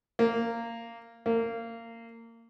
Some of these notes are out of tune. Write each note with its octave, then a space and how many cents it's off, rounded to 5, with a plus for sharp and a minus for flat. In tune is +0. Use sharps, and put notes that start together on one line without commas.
A#3 -15
A#3 -25